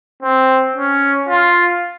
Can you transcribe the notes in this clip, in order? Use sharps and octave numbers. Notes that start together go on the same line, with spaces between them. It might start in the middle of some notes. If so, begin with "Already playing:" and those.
C4
C#4
F4